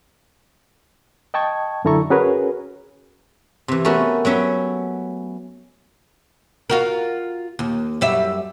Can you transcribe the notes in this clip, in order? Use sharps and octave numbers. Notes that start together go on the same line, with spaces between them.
D#5 G5 A5 C#6 G#6
F#2 D3 E4 A4 A#5 C#6
C#4 F#4 G#4 A#4 B4 C#5
C3 E3
A3 B3 C#4 F#4 A#4 E5
F#3 B3 C#4 E5 G5
F4 F#4 A#4
D#2
F#2 G3 E5